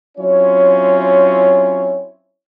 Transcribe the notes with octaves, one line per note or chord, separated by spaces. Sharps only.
F#3 C4 C#4 E4 F4 C#5